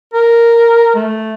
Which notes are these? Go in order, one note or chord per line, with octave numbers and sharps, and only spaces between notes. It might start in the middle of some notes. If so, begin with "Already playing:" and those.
A#4
A3